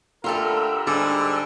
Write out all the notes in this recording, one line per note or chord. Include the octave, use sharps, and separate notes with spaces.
D3 A3 F4 G4 A4 A#4 B5 E6
G#2 D3 G3 G#4